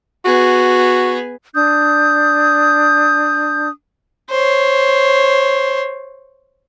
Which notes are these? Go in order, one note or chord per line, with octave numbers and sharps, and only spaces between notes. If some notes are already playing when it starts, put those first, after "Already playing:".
B3 F#4 G#4
D4 D#6 G6
C5 C#5